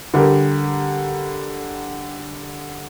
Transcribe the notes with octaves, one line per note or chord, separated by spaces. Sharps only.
D3 G3 G4 A#4